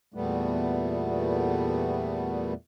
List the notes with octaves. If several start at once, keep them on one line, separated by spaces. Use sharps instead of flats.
E2 A#2 G3 A3 B3